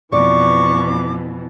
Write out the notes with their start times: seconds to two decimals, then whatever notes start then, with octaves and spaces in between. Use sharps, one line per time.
0.13 F2 B2 E3 D5 C#6 D6